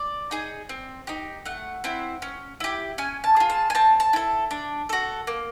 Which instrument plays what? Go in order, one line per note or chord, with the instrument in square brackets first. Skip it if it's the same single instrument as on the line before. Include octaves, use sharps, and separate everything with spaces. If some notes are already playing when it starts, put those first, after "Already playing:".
Already playing: [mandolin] D5
D#4 G#4
C4
D#4 G4
A3 F#5
C4 E4
C#4
E4 G4
C#4 G#5
A5
F4 G#4
A5
G#5
C4 A5
A5
E4 A4
D4
F#4 A4
A#3